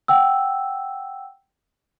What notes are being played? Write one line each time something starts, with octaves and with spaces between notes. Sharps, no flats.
F#5 G5 E6